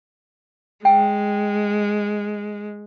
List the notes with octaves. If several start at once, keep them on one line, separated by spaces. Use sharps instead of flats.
G#3 G5